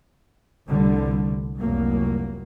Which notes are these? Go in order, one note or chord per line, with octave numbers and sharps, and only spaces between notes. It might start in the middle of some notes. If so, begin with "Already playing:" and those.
F1 C2 D3 G3
F1 C2 F#3 A#3